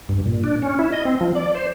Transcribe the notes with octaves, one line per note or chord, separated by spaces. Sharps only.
G2
A#2
D4
C#4
E4
D#5
C4
F3
D5
C5